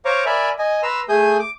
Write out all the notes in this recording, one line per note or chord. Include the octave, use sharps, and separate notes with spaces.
C5 C#5 F5 A#5 C#6 D6
A#4 D5 E5 G#5 B5
D#5 G#5
B4 A#5 C6 E6
A3 G#4 G#5 D#6 G6
D6